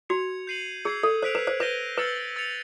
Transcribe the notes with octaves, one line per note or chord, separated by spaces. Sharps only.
F#4 G#6 C#7 F7
G6 C7 D#7 F#7
G#4 E6 G#6 C7
A4
C5 F#6 B6 D7 F7
B4
C5
B4 G6 A#6 D#7 G7
B4 E6 A6 C#7 F#7
E6 A6 C#7 F7